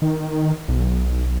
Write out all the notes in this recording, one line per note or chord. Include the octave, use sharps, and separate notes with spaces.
D#3
B1